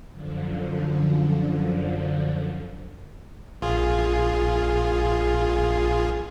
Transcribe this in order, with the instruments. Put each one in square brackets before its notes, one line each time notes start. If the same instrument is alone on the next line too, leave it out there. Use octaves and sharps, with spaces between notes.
[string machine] F#2 D3 F3
[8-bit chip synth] A#1 F4 G#4